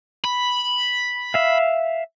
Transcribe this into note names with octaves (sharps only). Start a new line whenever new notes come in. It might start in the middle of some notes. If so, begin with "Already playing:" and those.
B5
E5 F5